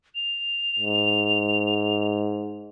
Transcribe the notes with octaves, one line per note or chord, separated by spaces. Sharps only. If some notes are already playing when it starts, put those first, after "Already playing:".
F7
G#2